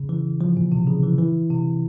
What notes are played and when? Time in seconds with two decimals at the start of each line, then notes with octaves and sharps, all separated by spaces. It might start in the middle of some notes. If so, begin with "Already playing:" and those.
Already playing: C#3
0.09 E3
0.41 F3
0.57 A#2
0.72 C3
0.87 C#3
1.03 E3
1.19 E3
1.50 C3